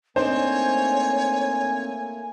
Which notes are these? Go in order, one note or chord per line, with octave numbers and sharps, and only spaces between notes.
A3 A#3 C4 D4 D#4 C5 C#5 G#5